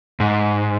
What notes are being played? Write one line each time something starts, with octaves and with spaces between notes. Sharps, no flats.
G#2